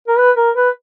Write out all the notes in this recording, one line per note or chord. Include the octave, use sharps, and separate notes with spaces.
A#4
B4
A#4
B4